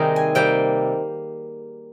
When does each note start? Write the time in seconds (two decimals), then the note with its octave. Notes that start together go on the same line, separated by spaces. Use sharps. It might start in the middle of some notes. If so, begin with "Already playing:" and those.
Already playing: C3 D#3 G3 A#3 C4 G#4 A#4
0.16 G#5
0.35 C3 G3 A#3 G5